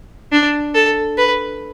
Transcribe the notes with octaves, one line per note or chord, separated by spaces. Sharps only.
D4
A4
B4